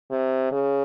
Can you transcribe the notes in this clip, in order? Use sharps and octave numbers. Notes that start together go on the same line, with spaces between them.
C3
C#3